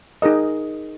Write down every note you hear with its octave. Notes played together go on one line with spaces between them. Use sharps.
D#4 G#4 A#4 D#5